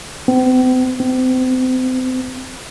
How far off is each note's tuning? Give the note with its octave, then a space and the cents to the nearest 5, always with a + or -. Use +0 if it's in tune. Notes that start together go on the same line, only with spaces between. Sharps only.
C4 -45
C4 -35